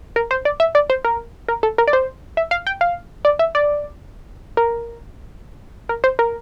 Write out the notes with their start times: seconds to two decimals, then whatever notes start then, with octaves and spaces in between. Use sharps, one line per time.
0.16 A#4
0.31 C5
0.45 D5
0.60 E5
0.75 D5
0.90 C5
1.05 A#4
1.49 A#4
1.63 A4
1.78 A#4
1.87 D5
1.93 C5
2.37 E5
2.51 F5
2.67 G5
2.81 F5
3.25 D5
3.39 E5
3.55 D5
4.57 A#4
5.89 A#4
6.04 C5
6.19 A#4